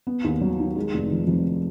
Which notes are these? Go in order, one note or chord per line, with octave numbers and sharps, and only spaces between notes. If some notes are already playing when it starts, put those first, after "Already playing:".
B3
D#2
F#3
D#3
G#3
F1
F3
F2